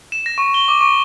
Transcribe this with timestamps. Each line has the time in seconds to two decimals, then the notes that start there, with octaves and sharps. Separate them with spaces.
0.12 E7
0.26 A#6
0.38 C#6
0.54 G7
0.68 D6
0.81 C#6